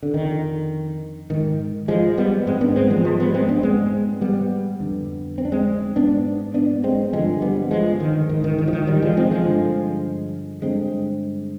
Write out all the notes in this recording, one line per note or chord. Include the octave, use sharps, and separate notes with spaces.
D3
F2 D3 D#3
G#2 D#3
F3 G#3
G3 B3
G#2 G#3 C4
B3 D4
G#3 C4
F3 G#3
F3 G#3
G3 B3
G#3 C4
B3 D4
G#2 G#3 C4
G3 B3
F2 D3
C4
D4
G#3 C4
G#2 B3 D4
B3 D4
G#3 C4
G2 D3 F3 G#3
G3 B3
F3 G#3
D#3
G#2 D#3
D#3
D#3
F3
D#3
D#3 G3
F3 G#3
G#3 C4
F3 G#3
G2 D3
G2 D3 G#3 C4